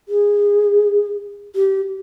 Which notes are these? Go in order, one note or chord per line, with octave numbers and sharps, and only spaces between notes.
G#4
G4